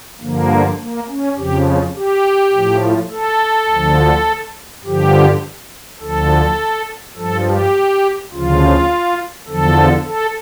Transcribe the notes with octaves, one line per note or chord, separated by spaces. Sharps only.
G2 D3 F3 A#3
A#3
C#4
F2 C#3 F3 G4
G4
A2 F3
A4
D2 D3 F3
G2 D3 F3 G4
D2 D3 F3 A4
G2 F3 A4
G4
D2 C#3 F3 F4
E2 D3 F3 A4
A4